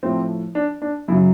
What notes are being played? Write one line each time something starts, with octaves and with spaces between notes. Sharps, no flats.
A2 F3 A3 C4
D4
D4
F#2 C#3 F#3 E4